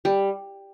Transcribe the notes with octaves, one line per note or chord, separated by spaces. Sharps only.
G3